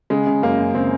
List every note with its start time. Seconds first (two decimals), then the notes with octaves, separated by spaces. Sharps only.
0.10 C#3 G#3
0.27 C#3
0.42 F#2 A#3
0.59 F#2
0.75 C#3 C4